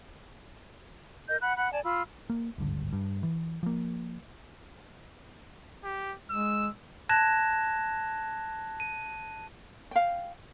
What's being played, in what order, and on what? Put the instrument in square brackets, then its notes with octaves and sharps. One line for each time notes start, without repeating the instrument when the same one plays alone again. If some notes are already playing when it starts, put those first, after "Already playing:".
[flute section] A#4 D#5 G6
F#5 B5 F#6
F#5 B5 F#6
D5 G#5 A5
F4 B5 E6
[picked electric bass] A#3
D1 G#1 G2 D3
G2
E3
F3 A#3
[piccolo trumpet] G4
[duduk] G#3 [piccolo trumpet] E6
[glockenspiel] A5 F#6 G#6 A#6 E7
D#7
[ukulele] F5 G5